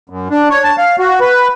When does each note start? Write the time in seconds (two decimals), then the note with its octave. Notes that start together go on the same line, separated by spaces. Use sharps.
0.10 F#2
0.30 D4
0.50 C#5
0.64 A5
0.78 F5
0.99 F#4
1.20 B4